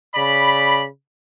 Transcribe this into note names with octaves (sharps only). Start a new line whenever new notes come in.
C#3 D5 B5